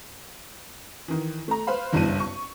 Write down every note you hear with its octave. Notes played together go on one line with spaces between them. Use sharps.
D#3 E3
A3 A#5
B4 C5 F5 B5
F#1 B1 G2 G3 E4 D#7
C#6